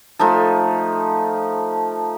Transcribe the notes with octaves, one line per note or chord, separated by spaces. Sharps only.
F3 A3 D#4 A4